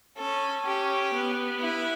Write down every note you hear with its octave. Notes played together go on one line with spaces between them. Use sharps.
C#4 A4
C#4 G4
B3
E4